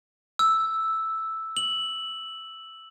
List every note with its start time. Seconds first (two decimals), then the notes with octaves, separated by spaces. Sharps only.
0.39 E6
1.57 F#7